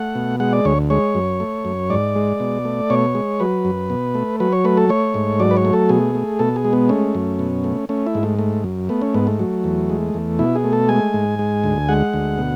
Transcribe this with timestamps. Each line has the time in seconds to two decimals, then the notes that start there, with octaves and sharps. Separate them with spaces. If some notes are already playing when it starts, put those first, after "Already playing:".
Already playing: A3 F#5
0.15 B2
0.40 G#3 F#5
0.53 D5
0.65 D2 C#5
0.90 G#3 C#5
1.15 F#2
1.40 A3
1.65 F#2
1.90 G#2 D5
2.16 G#3
2.40 B2
2.65 A3
2.90 B2 C#5
3.15 G#3
3.40 F#3 B4
3.65 F#2
3.90 B2
4.14 A3
4.40 F#3 B4
4.52 C#5
4.65 A3 B4
4.77 A4
4.89 A3 C#5
5.14 G#2
5.40 F#3 D5
5.51 B4
5.57 C#5
5.65 A3
5.73 A4
5.89 B2 G#4
6.15 A3
6.39 B2 A4
6.56 G#4
6.65 G#3
6.73 B3
6.89 A3 C#4
7.15 F#2
7.39 B2
7.64 A3
7.89 A3 C#4
8.07 E4
8.15 G#2
8.23 A3
8.39 A3
8.64 F#2
8.89 A3 B3
9.02 C#4
9.14 G#2 B3
9.27 A3
9.39 F#3
9.64 E2
9.90 G#3
10.14 E2
10.39 B2 E4
10.55 G#4
10.64 A3
10.73 A4
10.89 G#3 G#5
11.14 G#2
11.39 G#3
11.64 D2
11.89 G#3 F#5
12.13 D2
12.38 B2